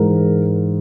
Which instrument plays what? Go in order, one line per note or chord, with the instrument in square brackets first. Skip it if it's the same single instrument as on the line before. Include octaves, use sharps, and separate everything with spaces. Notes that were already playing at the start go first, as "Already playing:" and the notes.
Already playing: [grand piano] G#2 E3 A#4